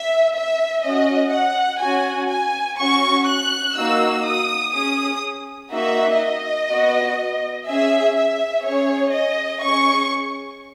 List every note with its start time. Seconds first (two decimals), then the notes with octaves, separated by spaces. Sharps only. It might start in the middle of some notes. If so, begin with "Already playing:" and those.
Already playing: E5
0.35 E5
0.84 C#4 F#4 D#5
1.33 F#5
1.81 C#4 F#4 G#5
2.30 G#5
2.79 C#4 F#4 C#6
3.28 F#6
3.77 A#3 D#4 F#4 E6
4.26 D#6
4.74 C#4 G#4 D#6
5.72 A#3 D#4 F#4 E5
6.21 D#5
6.70 B3 F#4
7.67 C#4 G#4 E5
8.16 E5
8.65 C#4 G#4 C#5
9.14 D#5
9.63 C#4 G#4 C#6